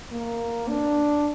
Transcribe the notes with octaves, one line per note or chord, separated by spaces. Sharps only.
A#3
D4